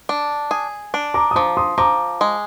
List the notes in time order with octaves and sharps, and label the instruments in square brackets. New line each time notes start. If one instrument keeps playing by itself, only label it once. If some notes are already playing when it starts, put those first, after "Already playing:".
[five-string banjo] D4
G#4
D4
[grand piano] A#5 D6
D#6
[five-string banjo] F3 [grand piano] A#5 D6
[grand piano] C6 D#6
[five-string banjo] F3 [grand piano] A#5 D6
[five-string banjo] G#3